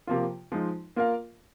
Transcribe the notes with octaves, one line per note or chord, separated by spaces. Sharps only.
C3 F3 A#3 F4
F3 G#3 D#4
A#3 F4 A#4 F5